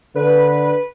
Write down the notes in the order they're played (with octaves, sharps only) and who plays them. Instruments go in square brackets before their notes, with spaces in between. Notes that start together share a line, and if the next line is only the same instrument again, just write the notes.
[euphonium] D3 [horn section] B4